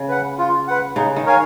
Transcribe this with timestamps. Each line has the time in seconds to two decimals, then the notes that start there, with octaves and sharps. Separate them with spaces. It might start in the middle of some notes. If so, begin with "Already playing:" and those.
Already playing: C#3
0.09 B4 F#5
0.38 F4
0.68 B4 F#5
0.96 C#3 D#4
1.16 D#3
1.26 A#4 C#5 F5 G#5